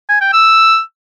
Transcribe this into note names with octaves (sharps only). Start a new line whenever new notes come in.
G#5
G5
E6